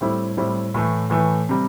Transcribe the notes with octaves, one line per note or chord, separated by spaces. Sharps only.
A2 G3 C4 E4 A4
A2 G3 C4 E4 A4
A2 E3 A3
A2 E3 A3
C3 G3